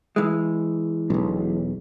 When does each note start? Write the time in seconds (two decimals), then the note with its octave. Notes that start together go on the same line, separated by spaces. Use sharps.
0.16 E3 G#3
1.10 E1 B1